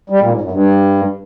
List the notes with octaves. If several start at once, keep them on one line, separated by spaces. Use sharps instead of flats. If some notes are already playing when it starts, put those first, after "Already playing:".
G3
A#2
G#2
F#2
G2